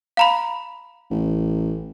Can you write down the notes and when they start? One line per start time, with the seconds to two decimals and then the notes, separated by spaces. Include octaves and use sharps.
0.17 F5 A#5 B5
1.10 A1